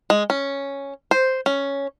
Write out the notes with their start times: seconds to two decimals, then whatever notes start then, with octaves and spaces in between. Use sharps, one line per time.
0.10 G#3
0.30 C#4
1.11 C5
1.46 C#4